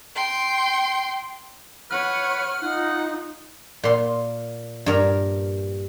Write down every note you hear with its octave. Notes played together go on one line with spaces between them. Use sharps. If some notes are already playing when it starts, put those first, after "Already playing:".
G5 C6
B4 C#5 F#5 F6
D#4 F4 F#5
A#2 C6
G2 A#4